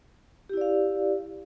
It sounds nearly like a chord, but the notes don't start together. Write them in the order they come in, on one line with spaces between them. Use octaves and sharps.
G4 E4 D5 F5